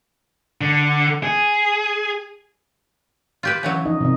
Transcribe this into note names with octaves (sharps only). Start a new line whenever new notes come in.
D3
G#4
F4 G4 B4
C#3 E3 F#3
F3 D#4 D#5
C3 D#3 D#5